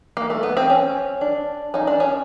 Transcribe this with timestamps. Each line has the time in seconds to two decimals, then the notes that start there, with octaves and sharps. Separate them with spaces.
0.17 A#3
0.30 A3
0.43 B3
0.57 C4
0.70 C#4
1.21 D4
1.74 C#4 D#4
1.87 D4
2.00 C#4